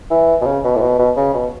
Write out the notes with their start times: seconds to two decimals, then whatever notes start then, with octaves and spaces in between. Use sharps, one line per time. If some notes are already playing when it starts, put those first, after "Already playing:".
0.11 E3
0.41 B2
0.46 C#3
0.64 B2
0.76 A2
0.81 B2
0.99 B2
1.17 C#3
1.34 B2